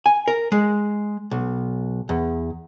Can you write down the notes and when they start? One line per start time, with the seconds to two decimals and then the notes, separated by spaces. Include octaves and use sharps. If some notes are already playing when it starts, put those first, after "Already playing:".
0.06 G#5
0.28 A#4
0.52 G#3
1.31 B1
2.09 E2